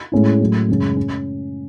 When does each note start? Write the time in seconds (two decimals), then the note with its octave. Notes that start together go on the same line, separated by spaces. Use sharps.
0.12 A2 G#3 C#4 E4
0.41 A2 F#3 A3
0.68 F#2 C#3 G#3 C#4
0.96 C#4